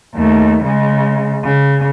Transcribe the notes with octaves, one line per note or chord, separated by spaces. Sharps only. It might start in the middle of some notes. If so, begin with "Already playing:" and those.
D#2 A3
C#3 G#3
C#3